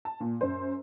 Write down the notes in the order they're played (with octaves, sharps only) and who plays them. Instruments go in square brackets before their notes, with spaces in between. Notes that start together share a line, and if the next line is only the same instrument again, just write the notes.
[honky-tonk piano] A5
A#2
F#2 C5